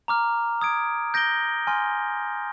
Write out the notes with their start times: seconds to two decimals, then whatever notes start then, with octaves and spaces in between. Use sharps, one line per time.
0.08 A#5 D6 F6
0.61 D#6 G#6 D7
1.14 G6 A#6 D7 G7
1.67 G#5 C6 F6